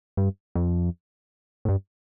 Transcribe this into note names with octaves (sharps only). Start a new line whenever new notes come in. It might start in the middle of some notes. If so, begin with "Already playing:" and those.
G2
F2
A2
G2